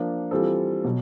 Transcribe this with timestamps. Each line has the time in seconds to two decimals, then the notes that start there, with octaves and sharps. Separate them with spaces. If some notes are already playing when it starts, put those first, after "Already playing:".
Already playing: F3 A#3 D4
0.31 E3 G3 C4 F4 A4
0.84 B2 F#3